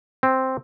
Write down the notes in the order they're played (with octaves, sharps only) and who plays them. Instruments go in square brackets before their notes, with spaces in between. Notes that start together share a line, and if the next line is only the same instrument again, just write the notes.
[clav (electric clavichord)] C4